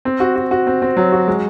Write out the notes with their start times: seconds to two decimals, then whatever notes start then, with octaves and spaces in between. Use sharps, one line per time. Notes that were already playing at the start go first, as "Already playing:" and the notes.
0.05 C4
0.20 F#4
0.36 F#4
0.51 F#4
0.67 C4
0.82 C4
0.97 F#3
1.12 F#4
1.28 G#3